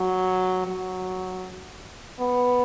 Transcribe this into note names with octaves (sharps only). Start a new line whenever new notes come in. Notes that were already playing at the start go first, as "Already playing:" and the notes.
Already playing: F#3
F#3
B3